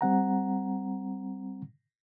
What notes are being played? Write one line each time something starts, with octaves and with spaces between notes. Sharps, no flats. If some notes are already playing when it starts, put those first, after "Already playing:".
G3 C4 F#5 A#5